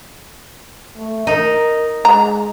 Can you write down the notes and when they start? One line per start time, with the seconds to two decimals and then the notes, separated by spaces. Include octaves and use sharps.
0.97 A3
1.27 D#4 A#4
2.05 G#3 A#5